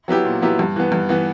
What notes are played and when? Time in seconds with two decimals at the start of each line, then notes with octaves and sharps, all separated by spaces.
0.08 F#3 B3 E4 G4
0.25 A#2
0.42 F#3 B3 E4 G4
0.59 G2
0.76 E3 B3
0.92 G2
1.09 E3 B3